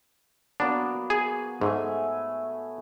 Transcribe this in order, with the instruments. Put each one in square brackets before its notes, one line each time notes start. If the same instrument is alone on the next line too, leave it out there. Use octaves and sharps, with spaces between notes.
[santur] F#3 A#3 B3 [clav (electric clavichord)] D4
[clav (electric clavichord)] G#4
[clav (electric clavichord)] G#2 [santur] A3 E5 G#5